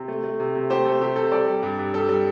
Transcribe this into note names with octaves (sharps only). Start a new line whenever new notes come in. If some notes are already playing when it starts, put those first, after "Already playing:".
Already playing: C3
A3
A3
C3
C3
A3 G4 C5
A3 A4
C3 G4
C3 A4
G3 A4 D5
G3
G2
G2
G3 A4
G3